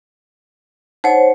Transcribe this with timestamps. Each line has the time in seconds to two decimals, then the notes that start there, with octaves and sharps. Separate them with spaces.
1.04 D#4 C5 C#5 F#5